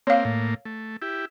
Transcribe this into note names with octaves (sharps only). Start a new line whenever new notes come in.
A#3 C4 C#5 F5
A2 A#3
A3
E4 G4